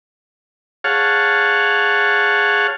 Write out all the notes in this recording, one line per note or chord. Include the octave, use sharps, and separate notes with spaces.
G#4 C#5 F5 F#5 A5